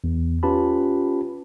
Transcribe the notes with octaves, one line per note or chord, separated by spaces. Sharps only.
E2
C#4 F4 G4 B4 A5 B5